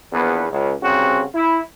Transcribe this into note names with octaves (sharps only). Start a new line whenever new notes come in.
A#1 E2 B3
C#2
C2 C#3 C4 F#4
E4